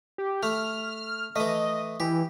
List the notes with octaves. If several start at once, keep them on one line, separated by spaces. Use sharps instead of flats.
G4
A3 F6
E3 A3 D#5
E3 G4